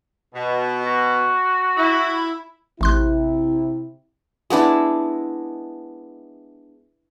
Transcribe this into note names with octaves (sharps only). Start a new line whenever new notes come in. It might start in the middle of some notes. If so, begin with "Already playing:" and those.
B2
F#4
E4
A1 C3 E4 C6 F#6
G#3 B3 D4 E4